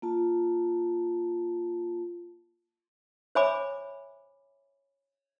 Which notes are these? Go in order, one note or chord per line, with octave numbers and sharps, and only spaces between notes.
A#3 F4 A5
C5 C#5 E5 G#5 B5 D6